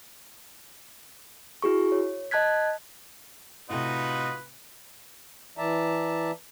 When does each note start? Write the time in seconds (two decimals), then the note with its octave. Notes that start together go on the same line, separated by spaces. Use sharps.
1.62 E4 F#4 G#4 C#6
1.92 C#5
2.31 D#5 A5 F#6 G#6 B6
3.70 A2 C3 D#4 F4 F#4 B4 D#5
5.58 E3 D5 E5 A5 A#5